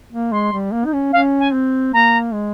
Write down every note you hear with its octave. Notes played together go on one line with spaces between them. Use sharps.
A#3
G#3 C6
G3
A#3
D#4
C#4
C#4 F5
G#5
C4
A#3 A#5
G#3